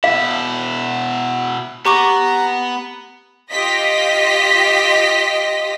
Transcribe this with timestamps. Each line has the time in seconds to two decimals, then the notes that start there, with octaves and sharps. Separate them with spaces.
0.04 B2 E4 F5
1.85 B3 G4 A#5 C#6 D6
3.50 F4 G4 D#5 A#6 B6